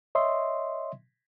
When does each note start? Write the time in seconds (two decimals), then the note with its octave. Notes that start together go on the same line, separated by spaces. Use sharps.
0.15 C#5 D#5 E5 C6